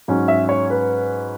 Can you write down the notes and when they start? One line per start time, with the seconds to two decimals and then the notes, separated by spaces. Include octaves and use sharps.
0.08 G#2 F#3 C#4
0.28 E5
0.49 C#5
0.70 B4